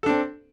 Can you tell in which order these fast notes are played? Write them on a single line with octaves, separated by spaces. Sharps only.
A4 D4 C4